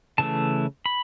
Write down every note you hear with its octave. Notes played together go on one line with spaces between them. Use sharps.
C#3 E3 A3 A5
B5